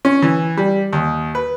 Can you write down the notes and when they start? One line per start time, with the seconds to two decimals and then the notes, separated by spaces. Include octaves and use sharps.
0.05 C#4
0.22 E3
0.57 G3
0.93 D#2
1.35 B4